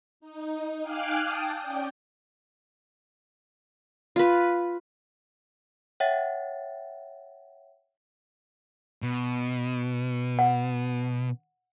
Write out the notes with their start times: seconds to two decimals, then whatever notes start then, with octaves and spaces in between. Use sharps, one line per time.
0.20 D#4
0.82 F5 G5 G#5 D6 F6 F#6
1.19 G5 A5 D#6
1.57 C#4 D5 G5
4.16 F4 B4
6.00 C#5 E5 F#5 G5 A6
9.02 B2
10.39 F#5